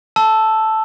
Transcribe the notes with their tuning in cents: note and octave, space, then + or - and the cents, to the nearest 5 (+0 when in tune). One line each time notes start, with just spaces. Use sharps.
A5 +0 E6 +0